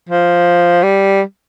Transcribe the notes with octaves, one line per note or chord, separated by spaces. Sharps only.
F3
G3